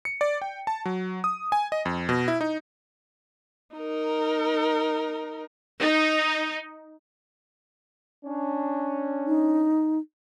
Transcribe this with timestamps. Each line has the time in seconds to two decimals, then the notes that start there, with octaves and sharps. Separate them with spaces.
0.05 C#7
0.21 D5
0.42 G5
0.67 A5
0.85 F#3
1.24 D#6
1.52 G#5
1.72 D#5
1.85 F2
2.09 B2
2.28 E4
2.41 D#4
3.76 D#4 A#4
5.78 D#4
8.25 C#4 D4
9.27 D#4